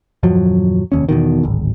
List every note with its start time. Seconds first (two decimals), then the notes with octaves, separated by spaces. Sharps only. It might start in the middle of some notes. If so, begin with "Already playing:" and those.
0.23 D#1 F#2 F3 F#3
0.92 F1 D#2 C#4
1.09 E2 B2 D#3
1.43 D1 G#1